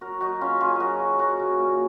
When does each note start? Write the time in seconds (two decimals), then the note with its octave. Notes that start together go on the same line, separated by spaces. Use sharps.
0.01 F#3 F#4 A#4
0.21 F#3 D#4 F#4
0.41 C#3 C#4 F4
0.60 C#3 F4 G#4
0.76 F#3 F#4 G#4 A#4
0.99 F#3
1.19 F#3 F#4 A#4
1.40 C#3
1.59 A#2